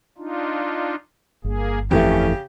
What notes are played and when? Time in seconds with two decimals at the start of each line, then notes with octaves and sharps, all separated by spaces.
0.18 D4 D#4 F4
1.44 G1 A#3 G#4
1.91 F2 C#3 E3 A3 C#4 G4